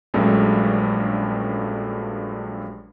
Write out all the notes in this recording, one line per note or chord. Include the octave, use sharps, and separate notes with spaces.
A#1 G2 F#3 G#3 A3 C#4